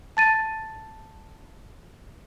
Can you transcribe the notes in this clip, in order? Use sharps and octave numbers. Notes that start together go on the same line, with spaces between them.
A5 A6 D#7